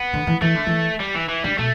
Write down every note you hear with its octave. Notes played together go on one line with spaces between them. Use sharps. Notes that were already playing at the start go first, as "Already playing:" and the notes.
Already playing: B3
D3
E3
E3 A3
D3
E3
G3
E3
E3
D3 G3
B2 A3